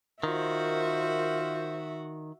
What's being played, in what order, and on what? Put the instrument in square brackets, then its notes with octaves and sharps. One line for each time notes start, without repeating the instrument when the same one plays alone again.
[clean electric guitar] D#3 [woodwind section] F4 A#4 C5 [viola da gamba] F#4 [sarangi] E5